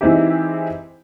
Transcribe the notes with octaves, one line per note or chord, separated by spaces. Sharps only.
E3 G#3 C4 D#4 E4 G4